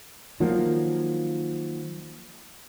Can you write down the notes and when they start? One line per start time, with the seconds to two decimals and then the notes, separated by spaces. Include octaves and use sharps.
0.40 D#3 F3 F#3 A#3